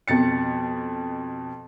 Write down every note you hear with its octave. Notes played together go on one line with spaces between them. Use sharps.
F2 B2 A6 C#7